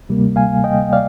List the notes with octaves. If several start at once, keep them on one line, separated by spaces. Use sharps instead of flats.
D2 C3 G3 A#3
F5 G#5
D#5 G5
D5 F5